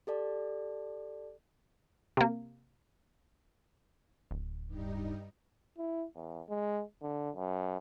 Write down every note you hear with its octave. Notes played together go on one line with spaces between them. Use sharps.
G4 A4 D5 A5
C3 A#3
D1
G2 G3 D#4
E4
E2
G#3
D3
F#2